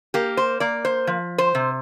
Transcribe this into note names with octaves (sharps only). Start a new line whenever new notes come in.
A#3 G4
C5
A#3 D5
C5
F3
C5
C3